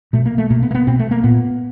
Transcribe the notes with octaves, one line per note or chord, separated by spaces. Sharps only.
B2 A3
A#3
A3
B2 A#3
B3
A#3
B3
B2 C4
A3
A#3
A#2 B3